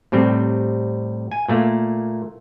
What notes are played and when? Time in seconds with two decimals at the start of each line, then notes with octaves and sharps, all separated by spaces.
0.12 A2 C3 G3 C4
1.31 G#5
1.48 A#2 A3 A#3